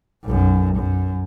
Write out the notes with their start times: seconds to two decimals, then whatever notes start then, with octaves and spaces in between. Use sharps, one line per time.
0.25 B1 F#2
0.76 F#2